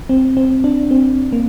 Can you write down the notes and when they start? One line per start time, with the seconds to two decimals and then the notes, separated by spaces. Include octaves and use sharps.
0.09 C4
0.37 C4
0.64 D4
0.91 C4
1.33 A#3